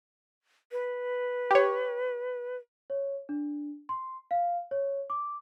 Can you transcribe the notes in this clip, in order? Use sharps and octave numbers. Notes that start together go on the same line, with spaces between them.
B4
G4 C#5
C#5
D4
C6
F5
C#5
D6